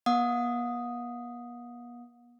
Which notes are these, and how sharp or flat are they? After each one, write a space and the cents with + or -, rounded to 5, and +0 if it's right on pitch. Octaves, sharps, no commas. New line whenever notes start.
B3 -45 F#5 -45 D#6 +0